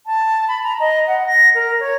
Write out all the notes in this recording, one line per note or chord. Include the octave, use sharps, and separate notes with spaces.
A5
B5
A#5
D#5
F#5
A#6
A#4
C#5